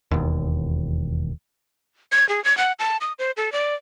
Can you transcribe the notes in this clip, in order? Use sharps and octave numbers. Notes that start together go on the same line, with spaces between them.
E1 D#2
G#6
G#4
G#6
F#5
A5
D#6
C5
A4
D5